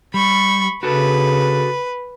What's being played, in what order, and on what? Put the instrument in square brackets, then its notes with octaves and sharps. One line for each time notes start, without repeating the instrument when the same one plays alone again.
[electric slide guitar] G3 [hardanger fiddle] B5 C#6
[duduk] C#3 [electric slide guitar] F#4 A4 [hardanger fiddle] B4